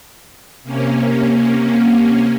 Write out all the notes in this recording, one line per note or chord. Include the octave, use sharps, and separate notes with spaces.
C3 A#3 C#4